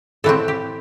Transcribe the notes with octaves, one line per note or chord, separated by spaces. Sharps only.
A2 E3 A3 C4 A4
G4